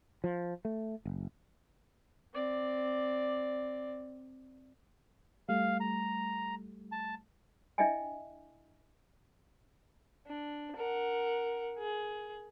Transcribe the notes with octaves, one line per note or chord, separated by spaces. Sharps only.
F3
A3
F#1
C4 D5
G3 A3 F5
A#5
A5
D4 E4 D#5 E5 G5 G#5
D4
A#4 F#5
G#4